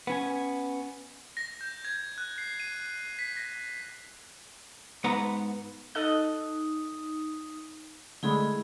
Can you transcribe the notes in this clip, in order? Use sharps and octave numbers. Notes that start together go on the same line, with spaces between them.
B3 C#4 G#5
A#6
G6
G#6
F#6
C7
D#7
B6
A#6
G#2 B3 B4 F#5 A#5
D#4 A4 D#5 D#6 F#6
D3 G#3 A3 E4 G#4 B5